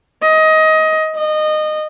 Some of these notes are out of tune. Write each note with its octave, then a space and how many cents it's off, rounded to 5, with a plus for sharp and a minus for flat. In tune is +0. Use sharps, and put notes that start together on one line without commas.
D#5 +20
D#5 -20